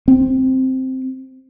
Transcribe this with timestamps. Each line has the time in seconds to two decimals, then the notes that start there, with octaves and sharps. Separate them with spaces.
0.08 C4